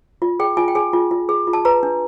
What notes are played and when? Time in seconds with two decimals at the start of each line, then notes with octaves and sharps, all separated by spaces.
0.22 F4
0.40 G#4 G5
0.57 F4 G#5
0.68 G5
0.75 G#4 G#5
0.93 F4
1.11 F4
1.29 G#4
1.47 F4
1.53 A5
1.65 B4 A#5
1.83 D4